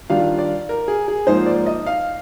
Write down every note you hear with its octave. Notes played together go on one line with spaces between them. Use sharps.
D#3 G3 D4 F4 F5
D5
A#4
G#4
G#4
G#2 F3 A#3 D#4 C5
D5
D#5
F5